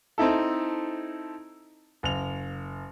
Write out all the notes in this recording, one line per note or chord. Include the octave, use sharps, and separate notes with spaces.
C4 D#4 E4 A4
F#1 F7